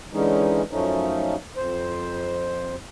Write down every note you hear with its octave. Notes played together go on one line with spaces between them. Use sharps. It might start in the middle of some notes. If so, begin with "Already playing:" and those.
D3 E3 G#3 C#4 D#4
F#2 F3 A3 C#4 D#4
F2 C5